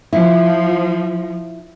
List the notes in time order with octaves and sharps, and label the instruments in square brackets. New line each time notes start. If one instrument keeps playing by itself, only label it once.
[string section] F3 [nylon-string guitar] E4